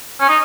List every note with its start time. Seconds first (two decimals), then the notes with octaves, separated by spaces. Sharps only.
0.20 C#4
0.29 D#4